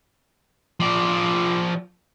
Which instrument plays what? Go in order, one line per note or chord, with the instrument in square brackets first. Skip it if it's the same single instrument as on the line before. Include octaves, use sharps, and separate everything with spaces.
[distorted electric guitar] F3 D5